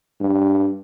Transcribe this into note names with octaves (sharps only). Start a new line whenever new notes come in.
G2